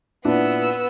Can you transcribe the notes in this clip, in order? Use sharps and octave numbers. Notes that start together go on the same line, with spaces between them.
A#2 B3 D4 E4 E6